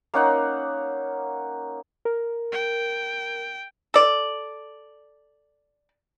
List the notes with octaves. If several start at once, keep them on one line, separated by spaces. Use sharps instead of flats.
A#3 C#4 D#4 F#5
A#4
G5
A4 D5